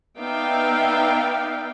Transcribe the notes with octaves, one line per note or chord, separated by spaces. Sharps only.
B3 D#4 D5 E5 F5 G5